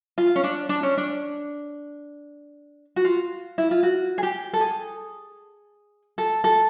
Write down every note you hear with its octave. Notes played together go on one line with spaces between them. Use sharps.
F4
C#4
D4
D4
C#4
D4
F#4
F4
E4
F4
F#4
G#4
G4
A4
G#4
A4
A4